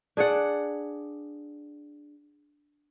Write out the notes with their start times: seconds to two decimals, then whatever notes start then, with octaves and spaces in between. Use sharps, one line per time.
0.17 D4 G#4 D5 F#5